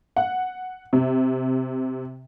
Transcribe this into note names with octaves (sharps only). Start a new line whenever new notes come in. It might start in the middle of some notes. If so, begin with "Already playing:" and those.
F#5
C3